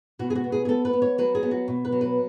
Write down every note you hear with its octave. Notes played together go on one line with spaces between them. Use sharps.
B2 F#4
G#4
F#4
B3
G#4
G#4
B3 A4
B4
B3
C#5
F#3 B4
G#4
B3
F#4
B2
B4
F#3
B4